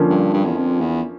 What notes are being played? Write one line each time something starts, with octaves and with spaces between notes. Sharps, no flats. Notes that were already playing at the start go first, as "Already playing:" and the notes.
Already playing: D3 F3 A#3 C#4
G2
G2
E2
F2
E2